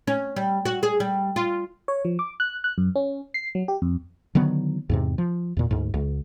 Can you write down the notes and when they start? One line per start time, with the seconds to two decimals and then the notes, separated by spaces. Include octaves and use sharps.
0.07 C#4
0.36 G3
0.65 F#4
0.83 G#4
1.00 G3
1.36 F4
1.88 C#5
2.05 F3
2.19 D6
2.40 F#6
2.64 F#6
2.78 F#2
2.96 C#4
3.34 C7
3.55 F#3
3.68 G4
3.82 F2
4.35 D3 D#3 F#3 B3
4.90 E2 G#2 C3
5.18 F3
5.57 E2 A#2
5.71 D2 G#2
5.94 C#2